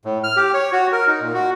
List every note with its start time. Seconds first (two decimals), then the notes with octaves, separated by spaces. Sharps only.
0.05 A2
0.24 F6
0.36 G4
0.54 C#5
0.72 F#4
0.92 A#4
1.07 D#4
1.21 A#2
1.34 F#4